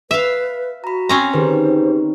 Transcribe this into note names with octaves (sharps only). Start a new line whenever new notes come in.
B4 E5 F5
F#4 A#5 B5
C4 C#4 A#5 C6
D#3 G4 G#4 B4 C5